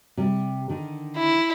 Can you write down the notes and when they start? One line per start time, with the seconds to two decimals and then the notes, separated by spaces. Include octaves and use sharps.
0.17 C3 G3
0.69 D3 D#3
1.17 E4